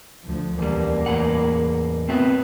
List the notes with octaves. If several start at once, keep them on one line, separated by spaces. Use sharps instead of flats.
D2 F3
E2 G3 A#3
E2 A2 F#5
B3 C4 F#4 E5